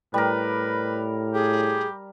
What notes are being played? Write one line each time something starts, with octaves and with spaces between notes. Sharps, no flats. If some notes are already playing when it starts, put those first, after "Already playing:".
A2 G3 A#4 B4
G4 G#4